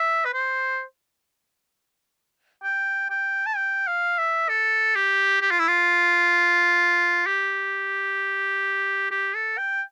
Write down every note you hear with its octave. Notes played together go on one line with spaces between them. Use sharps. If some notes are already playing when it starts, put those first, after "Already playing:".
Already playing: E5
B4
C5
G5
G5
A5
G5
F5
E5
A4
G4
G4
F4
E4
F4
G4
G4
A4
G5